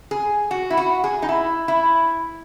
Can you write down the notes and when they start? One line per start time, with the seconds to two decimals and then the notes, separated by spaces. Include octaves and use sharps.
0.11 G#4
0.51 F#4
0.70 E4
0.77 F#4
1.04 G#4
1.22 D#4
1.29 E4
1.68 E4